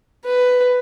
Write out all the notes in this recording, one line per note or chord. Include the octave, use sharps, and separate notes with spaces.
B4